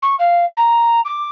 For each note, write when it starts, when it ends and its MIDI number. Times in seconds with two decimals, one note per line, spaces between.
0.02 0.15 85
0.19 0.45 77
0.57 1.00 82
1.05 1.30 86